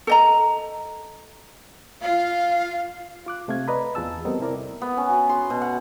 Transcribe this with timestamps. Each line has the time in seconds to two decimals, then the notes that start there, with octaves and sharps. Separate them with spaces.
0.07 A4 D#5 A#5
2.02 F4 F5
3.26 F4 D6 F#6
3.48 C3 A3 C4 F5 G#6
3.68 B4 D5 D#5 A#5 B5
3.95 E2 F4 G#4 A5 E6
4.25 G3 B3 C4 A4 A#4 D#5
4.39 C3 C4 E4 A#4 D5
4.82 B3
4.97 C#4
5.10 F#4
5.29 C6
5.50 B2
5.61 F#5